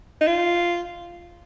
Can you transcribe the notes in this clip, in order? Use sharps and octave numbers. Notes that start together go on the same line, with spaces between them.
D#4
F4